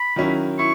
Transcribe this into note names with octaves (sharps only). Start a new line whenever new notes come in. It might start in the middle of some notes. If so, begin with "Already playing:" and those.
Already playing: B5
D#3 F#3 C#4 E4
E4 C#6